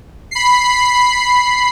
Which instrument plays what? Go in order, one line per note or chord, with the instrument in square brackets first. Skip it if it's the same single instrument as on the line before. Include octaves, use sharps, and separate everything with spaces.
[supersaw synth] B5 C7